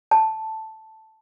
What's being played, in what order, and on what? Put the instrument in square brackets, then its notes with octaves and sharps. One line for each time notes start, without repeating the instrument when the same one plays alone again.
[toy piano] A5